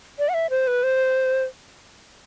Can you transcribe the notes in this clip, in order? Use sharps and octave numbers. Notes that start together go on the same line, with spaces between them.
D5
F#5
E5
C5
B4
C5